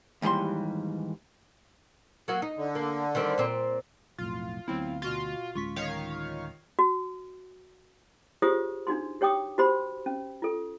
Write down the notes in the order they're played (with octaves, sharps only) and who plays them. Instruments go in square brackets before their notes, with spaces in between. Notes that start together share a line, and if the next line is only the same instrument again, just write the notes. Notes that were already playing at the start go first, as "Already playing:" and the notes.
[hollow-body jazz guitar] D#2 G#2 E3 G3 C6
[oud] F#3 A#3 F#4
D#4
[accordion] D3
[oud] A#3
D#3 G3 C4
A#2 C4
[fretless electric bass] B1 F2 A2 [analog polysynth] F4
[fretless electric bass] D2 B3 [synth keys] F#3 C4 E4
[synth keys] B2 F#4 C6 [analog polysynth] F4
[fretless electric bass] D1 G#3 C#4 [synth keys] F4 C#6 B6
[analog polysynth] D#3 C#5 F5
[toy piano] F#4
F4 G4 G#4 C5 C#5 D#6
D4 D#4 F#4 C6
G4 C#5 G5 D6 D#6
F#4 G4 C5 B5 C6
C#4
F4 A4